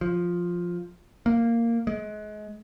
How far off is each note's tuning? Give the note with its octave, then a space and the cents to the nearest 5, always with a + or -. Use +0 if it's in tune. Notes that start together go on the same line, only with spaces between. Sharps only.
F3 +5
A#3 -10
G#3 +30